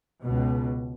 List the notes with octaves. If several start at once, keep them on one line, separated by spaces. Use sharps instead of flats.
C#2 B2